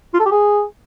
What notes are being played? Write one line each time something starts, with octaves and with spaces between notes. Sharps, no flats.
F4
A4
G4
G#4